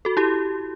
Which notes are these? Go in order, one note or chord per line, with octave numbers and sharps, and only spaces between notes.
F#4 A4
E4 G4